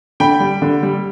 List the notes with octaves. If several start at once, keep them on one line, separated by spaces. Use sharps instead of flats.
D3 G5 B5
G3
D3
G3